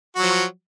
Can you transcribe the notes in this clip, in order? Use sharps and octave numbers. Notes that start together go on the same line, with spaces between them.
F3 F#3 F#4